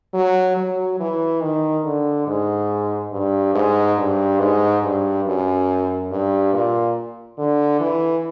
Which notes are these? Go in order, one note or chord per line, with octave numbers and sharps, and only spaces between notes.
F#3
F#3
E3
D#3
D3
G#2
G2
G#2
G2
G#2
G2
F#2
G2
A#2
D3
E3